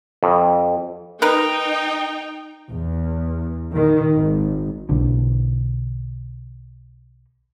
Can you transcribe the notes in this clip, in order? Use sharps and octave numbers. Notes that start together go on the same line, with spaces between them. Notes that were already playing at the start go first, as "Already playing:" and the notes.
F2
D#4 A#4 B4 G5
E2
D#3
G#1
B1 D3